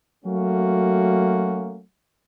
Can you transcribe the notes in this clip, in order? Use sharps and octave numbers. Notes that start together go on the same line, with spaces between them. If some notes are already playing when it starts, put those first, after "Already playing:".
F#3 A3 A#3 C#4 F#4